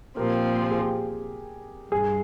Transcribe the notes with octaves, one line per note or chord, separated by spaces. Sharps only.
A#2 F3 C4 G4 A#4
G4
G#4
G4
G2 G#4